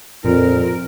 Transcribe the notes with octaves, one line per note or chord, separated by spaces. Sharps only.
F2 A#2 A#4